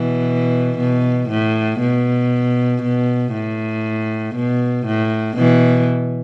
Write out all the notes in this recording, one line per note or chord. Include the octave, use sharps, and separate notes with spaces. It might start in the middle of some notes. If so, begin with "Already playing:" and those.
Already playing: B2 E3
B2
A2
B2
B2
A2
B2
A2
B2 E3